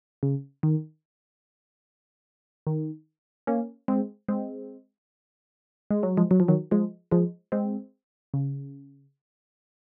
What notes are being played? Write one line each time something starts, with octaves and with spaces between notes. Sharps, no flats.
C#3
D#3
D#3
A#3 C#4
G#3 C4
G#3 C4
G#3
F#3
F3 G#3
F#3
F3
D#3 F#3
F3 G#3
F3 G#3
G#3 C4
C#3